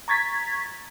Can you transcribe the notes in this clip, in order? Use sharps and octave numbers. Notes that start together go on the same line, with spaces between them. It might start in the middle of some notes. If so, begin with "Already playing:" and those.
A#5 C#6 G#6 A6 B6